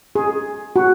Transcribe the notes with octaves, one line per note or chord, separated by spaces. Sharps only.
G#4
F#4